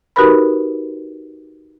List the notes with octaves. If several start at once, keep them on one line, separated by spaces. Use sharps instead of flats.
D#4 F#4 G4 A#4 B4 B5